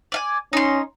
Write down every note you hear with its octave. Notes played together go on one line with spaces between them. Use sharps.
D5 F5 G#5
C#4 D#4 C6